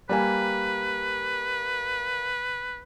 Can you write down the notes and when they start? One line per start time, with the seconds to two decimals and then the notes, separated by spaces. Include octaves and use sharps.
0.09 G3 A#3 B4 G#5